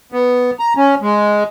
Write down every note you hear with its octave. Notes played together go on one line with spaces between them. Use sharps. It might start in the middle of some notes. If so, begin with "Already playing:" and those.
B3
A#5
C#4
G#3